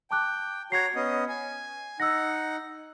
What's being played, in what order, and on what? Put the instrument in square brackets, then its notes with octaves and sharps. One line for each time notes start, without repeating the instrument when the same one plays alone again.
[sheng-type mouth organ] G5 [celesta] A5 D6 F#6
[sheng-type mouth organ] F#4 C#5 A#5 [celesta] G#6 C7
[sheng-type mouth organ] B3 C#4 D#5
G#5
[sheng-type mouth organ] D#4 F#5 [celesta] E6 A#6